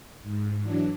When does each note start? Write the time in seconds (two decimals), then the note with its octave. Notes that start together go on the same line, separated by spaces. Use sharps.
0.22 G#2
0.62 E3 F#3 D4